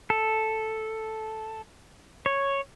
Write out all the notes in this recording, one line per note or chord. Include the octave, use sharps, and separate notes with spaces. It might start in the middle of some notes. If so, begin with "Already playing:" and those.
A4
C#5